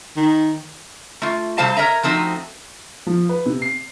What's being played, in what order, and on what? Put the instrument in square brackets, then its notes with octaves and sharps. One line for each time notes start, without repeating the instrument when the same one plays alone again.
[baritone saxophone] D#3
[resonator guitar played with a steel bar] A3 F4
C3 F#3 G3 C5 F5 A5
A#4 B4 C#5 D#5 E5 A#5
F3 A3 C4 D#4 F#4
[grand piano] F3
B4
C3
C7